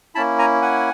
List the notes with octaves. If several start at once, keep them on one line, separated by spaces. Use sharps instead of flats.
A#3 C#4 E4 A5 B5
G#5 A#5
F#5 G#5